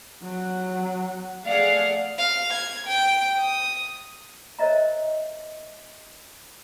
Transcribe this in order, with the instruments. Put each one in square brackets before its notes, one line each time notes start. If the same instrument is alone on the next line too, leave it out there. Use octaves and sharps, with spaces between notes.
[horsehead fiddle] F#3 F#5
[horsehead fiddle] A3 D5 [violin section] G#4 F5 F#5
[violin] F5
G#6
G5
D#6
[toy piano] A#4 C5 C#5 D#5 E5 A#5